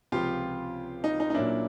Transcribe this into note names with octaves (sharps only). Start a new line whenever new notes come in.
C#2 C3 F3 F4 G4
D#4
D#4
D#4
A#2 F#3 A#3 C#4 D4 E4